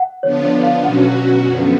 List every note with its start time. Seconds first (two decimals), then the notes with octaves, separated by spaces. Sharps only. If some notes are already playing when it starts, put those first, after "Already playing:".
Already playing: F#5
0.23 D3 F3 B3 D4 F4 C#5
0.44 C#5
0.63 F5
0.84 B2 F#3 C#4 F#4 F#5
1.46 F#2 D3 F3 B3